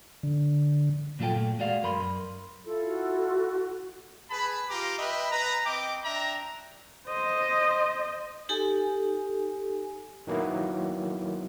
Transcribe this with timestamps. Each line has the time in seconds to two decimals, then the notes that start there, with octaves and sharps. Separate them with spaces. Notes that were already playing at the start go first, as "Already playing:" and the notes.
0.23 D3
1.19 A#2 F#3 F4 A4 G5
1.35 A#2 A3
1.59 G#3 F#4 D5 F5
1.83 F#2 A#4 B5 C6
2.63 E4 F4 A4
2.87 F#4
4.30 G#4 B4 A5 B5
4.69 F4 G4 A#5 D6
4.99 B4 D#5 E5 G5 B5
5.32 B4 A#5
5.66 C4 D#5 G5 D6
6.04 D4 E5 G5 A#5
7.07 C5 D#5
8.49 D#4 G4 A4 G#5
10.27 D#3 F#3 A#3 B3 E4